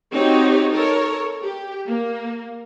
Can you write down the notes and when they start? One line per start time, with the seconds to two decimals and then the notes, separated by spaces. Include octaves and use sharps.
0.12 C4 D#4 F#4 G4 C#5
0.72 A4 A#4 C#5
1.43 G4
1.86 A#3